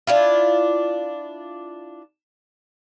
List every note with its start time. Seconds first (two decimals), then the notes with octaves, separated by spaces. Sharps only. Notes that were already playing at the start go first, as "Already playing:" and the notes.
0.07 D4 E4 F4